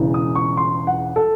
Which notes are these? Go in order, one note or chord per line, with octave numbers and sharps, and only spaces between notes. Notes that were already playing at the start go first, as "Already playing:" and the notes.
Already playing: E1 E2 C#3 E3
D#6
C#6
C6
F#5
A4